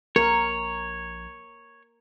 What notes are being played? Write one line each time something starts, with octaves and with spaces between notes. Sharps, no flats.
A#1 A#4 C#5